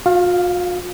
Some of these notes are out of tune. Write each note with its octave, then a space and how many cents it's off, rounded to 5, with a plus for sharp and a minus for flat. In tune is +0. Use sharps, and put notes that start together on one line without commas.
F4 +45 F5 +0